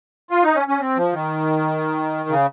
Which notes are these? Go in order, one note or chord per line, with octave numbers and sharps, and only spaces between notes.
F4
D#4
C#4
C#4
C4
F3
D#3
C#3